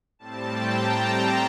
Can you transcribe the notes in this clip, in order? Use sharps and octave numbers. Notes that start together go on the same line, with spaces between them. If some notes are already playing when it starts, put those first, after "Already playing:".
A2 G3 C4 A5
G5
A#5
A#5